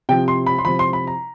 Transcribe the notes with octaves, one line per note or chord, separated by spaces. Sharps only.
C3 F3 G5
C6
B5
C6
C3 F3 B5
C6
B5
A#5